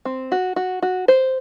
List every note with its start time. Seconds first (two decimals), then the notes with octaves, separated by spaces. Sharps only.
0.05 C4
0.32 F#4
0.56 F#4
0.82 F#4
1.08 C5